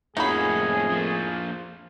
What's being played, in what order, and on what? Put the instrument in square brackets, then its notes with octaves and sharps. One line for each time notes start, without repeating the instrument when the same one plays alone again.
[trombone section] F2 A2 [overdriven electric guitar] A#3 C#4 [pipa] D#4 F#4 B5 [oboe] G#4
[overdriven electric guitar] A#2 F3